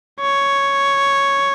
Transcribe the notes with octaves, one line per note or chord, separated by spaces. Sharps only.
C#5